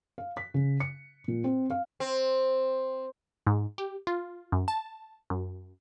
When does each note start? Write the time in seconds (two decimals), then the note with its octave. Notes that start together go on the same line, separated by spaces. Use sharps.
0.18 F5
0.37 B6
0.54 C#3
0.80 C#7
1.28 A#2
1.44 C4
1.70 F5
2.00 C4
3.47 G#2
3.78 G4
4.07 F4
4.52 F#2
4.68 A5
5.30 F#2